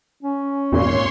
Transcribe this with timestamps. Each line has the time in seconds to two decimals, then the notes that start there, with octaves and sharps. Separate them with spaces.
0.23 C#4
0.72 G#1 E2 A#2 C#5 C6